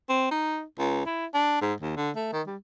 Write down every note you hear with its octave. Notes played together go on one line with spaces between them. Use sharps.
C4
D#4
C#2
E4
D4
G#2
D#2
D3
A3
D#3
G3